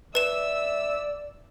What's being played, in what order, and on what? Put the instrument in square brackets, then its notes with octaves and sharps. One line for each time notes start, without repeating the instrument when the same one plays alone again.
[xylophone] B4 E7 [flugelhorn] D5 [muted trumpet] E5 [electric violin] E6